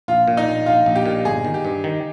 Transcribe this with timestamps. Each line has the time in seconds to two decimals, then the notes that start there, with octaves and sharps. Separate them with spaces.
0.08 A#1 F4
0.27 A#2
0.37 D#4
0.47 A#1
0.66 A#1 F4
0.86 A#1
0.95 G4
1.06 A#2
1.25 G1 G#4
1.45 D#3
1.54 G4
1.65 G2
1.84 D#3